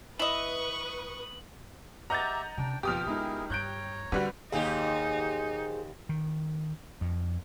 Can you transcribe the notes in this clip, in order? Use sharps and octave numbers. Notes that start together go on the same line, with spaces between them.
E4 B4 D#5 C#6 D#6 F#7
G4 D#5 E5 F#5 A#5 G6 A6
C3 C#4 D4 G5
F#1 F2 B2 F4 G4 G5 D#6 F6
C#2 B3 D#4 E4 G#4 A#4
G2 C#5 A#5 F#6 G6 D7
D3 G3 C4 F#4 B4
D#2 G#2 D#4 G4 G#4
D#3
F2